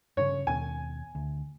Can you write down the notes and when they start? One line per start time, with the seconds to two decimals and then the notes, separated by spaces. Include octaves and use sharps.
0.17 G2 C#3 C#5
0.47 D#2 B2 G#5
1.15 D2